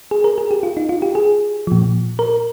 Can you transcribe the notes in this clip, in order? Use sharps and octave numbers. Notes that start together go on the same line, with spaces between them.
G#4
A#4
G#4
G4
F4
D#4
F4
G4
G#4
A#2 F3
A#4